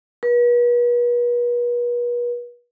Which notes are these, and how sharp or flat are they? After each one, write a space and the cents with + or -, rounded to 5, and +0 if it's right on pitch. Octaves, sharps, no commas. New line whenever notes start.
B4 -40